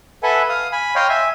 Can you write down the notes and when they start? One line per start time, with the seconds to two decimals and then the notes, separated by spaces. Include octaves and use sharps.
0.23 A4 B4 E5 F#5 G#5
0.49 F5 D#6
0.72 G#5 B5
0.95 C#5 D#5 F5 G5 C6
1.09 E5 G#5